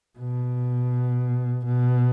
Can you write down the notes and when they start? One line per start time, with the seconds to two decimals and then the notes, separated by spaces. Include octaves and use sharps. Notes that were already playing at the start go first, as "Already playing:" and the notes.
0.19 B2
1.65 B2